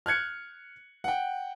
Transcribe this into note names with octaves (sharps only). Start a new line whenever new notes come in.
F6 F#6 G#6 C#7
F#5 G5